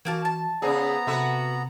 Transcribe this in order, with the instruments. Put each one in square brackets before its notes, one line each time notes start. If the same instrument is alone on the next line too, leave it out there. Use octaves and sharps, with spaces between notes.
[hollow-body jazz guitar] E3 F#4 [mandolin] A#3 F5 A5
[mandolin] A5
[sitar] C#3 G#4 [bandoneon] B3 A#5 [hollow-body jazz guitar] B4 C5 D5
[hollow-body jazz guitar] C3 A4 [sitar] F#4 B4 E5